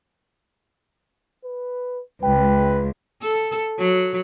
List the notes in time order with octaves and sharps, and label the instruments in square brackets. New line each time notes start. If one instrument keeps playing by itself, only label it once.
[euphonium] B4
[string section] C#2 [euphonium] B4 [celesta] G5
[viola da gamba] A4
F#3